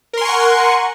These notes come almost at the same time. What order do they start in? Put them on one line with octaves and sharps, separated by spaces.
A#4 C6 G#5 C#6 F#5